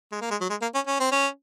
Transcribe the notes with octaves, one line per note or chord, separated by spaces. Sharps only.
G#3
A#3
G#3
F#3
G#3
A#3
C#4
C#4
C4
C#4